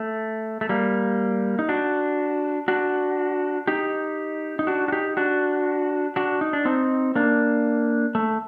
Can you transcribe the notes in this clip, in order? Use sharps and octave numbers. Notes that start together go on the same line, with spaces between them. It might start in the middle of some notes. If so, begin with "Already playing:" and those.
Already playing: A3
A3
G3 A#3
D#4
D4 F#4
D4 F#4
D#4 G4
D#4
D4 F#4
F#4
D#4 G4
D4 F#4
D4 F#4
D#4
D4
C4 D#4
A#3 D4
A3